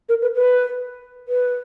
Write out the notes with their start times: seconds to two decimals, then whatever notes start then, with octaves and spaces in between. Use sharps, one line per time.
0.09 A#4
0.22 B4
0.35 B4
1.28 B4